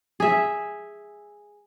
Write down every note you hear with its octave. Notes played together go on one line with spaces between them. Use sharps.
G#4 E5